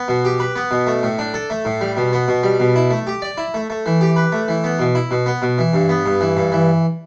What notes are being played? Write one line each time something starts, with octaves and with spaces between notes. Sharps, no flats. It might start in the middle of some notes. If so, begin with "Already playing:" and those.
Already playing: B3
B2
G4
B4
B3
B2
A3
A2
D4
A4
A3
A2
G3
B2
B3
B2
G3
B2
E4
A3
G4
D5
E4
A3
A3
E3
G4
B4
A3
E3
B3
B2
E4
B2
B3
B2
E3
G2
B3
G2
E3
G2
E3